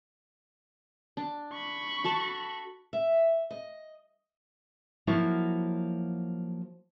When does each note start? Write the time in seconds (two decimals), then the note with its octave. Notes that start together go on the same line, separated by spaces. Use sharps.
1.17 D4
1.53 B5 C#6
2.04 F#4 A4 A5
2.93 E5
3.51 D#5
5.07 F3 F#3 A#3 E4 F#4